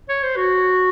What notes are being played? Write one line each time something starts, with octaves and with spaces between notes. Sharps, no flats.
C#5
C5
F#4